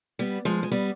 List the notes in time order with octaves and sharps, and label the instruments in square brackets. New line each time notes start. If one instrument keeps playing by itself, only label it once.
[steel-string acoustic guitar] G3 B3
F3 G#3
G#3
G3 B3